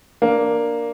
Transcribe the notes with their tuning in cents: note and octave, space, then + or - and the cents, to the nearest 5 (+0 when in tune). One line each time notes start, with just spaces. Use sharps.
A#3 +0 D4 +0